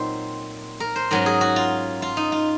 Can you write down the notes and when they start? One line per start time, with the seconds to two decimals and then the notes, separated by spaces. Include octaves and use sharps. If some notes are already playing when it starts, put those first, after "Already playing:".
Already playing: A#2 F#3 C4 D#4 C5
0.80 A#4
0.96 C5
1.11 G#2 F#3 C#4 A#4
1.26 G#4
1.41 F#4
1.56 F4
2.02 F4
2.17 D#4
2.32 F4